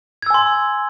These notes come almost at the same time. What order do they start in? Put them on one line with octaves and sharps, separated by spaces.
G#6 E6 G#5 C6